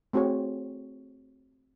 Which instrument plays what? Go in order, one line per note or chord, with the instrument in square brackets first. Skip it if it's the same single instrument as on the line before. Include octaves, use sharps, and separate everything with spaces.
[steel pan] A3 C4 F#4 G#4 C#5